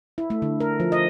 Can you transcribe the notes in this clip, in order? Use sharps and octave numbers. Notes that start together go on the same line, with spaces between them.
E4
A3
D3
A#4
F3
D#5